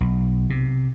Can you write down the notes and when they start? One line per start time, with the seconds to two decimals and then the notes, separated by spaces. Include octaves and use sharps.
0.01 B1
0.50 C3